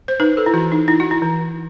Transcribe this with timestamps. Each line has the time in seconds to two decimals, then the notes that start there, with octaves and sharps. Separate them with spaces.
0.08 C5
0.20 D#4 B4
0.37 A4
0.46 E4
0.54 E3 F#4
0.72 D#4
0.88 D#4 E4
1.00 F#4
1.11 E4
1.22 E3